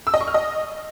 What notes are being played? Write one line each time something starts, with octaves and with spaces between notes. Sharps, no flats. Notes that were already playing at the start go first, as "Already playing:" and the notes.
E6
D#5
C#6
F6
D#5